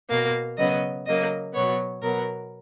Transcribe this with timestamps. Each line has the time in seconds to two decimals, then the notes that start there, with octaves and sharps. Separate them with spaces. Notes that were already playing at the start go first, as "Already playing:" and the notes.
0.10 B2 A#3 F5
0.58 C#3 F#3 B3 D#5
1.06 C#3 F#3 A#3 D#5
1.53 B2 F#3 B3 C#5
2.02 B2 F#3 B3 A#4